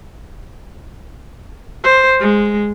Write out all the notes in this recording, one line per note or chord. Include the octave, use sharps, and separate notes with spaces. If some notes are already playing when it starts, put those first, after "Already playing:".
C5
G#3